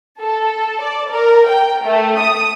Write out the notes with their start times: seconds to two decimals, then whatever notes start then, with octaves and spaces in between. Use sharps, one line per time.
0.20 A4
0.82 D5
1.11 A#4
1.48 G5
1.83 A3
2.20 D#6